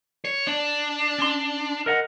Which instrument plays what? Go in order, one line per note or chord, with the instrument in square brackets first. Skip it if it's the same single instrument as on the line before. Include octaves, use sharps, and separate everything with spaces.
[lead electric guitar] C#5
D4
[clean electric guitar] C#4 C6
A#4 D#5 F#5